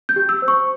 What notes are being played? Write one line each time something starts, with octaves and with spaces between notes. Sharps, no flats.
G6
G4
E6
C5
C#6